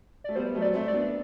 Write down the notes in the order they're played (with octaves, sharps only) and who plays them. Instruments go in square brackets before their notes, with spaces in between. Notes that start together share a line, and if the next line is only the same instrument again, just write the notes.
[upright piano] A3 [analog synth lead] D5
[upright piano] G3 B3 [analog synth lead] C5
[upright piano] F#3 A3
[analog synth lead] D5
[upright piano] A3 C4
[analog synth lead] D5
[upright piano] B3 D4